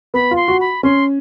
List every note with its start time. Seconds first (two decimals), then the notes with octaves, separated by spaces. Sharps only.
0.14 B3 B5
0.31 F4
0.36 C6
0.48 F#4
0.61 B5
0.83 C#4 C6